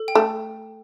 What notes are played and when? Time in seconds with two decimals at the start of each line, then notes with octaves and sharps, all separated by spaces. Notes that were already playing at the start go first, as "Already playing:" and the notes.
Already playing: A4
0.08 G5
0.15 A3